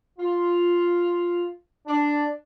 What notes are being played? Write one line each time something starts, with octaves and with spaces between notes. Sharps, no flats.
F4
D4